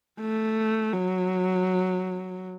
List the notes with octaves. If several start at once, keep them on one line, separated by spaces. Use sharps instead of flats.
A3
F#3